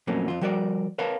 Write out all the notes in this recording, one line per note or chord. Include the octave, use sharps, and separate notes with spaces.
F2 A#2 F#3 A3 A#3 C#4
F2 F4
F3 G3 F#4 A#4 C#5 D5
A#4 B4 C#5 F5 A5 B5